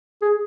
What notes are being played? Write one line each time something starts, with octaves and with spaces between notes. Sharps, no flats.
G#4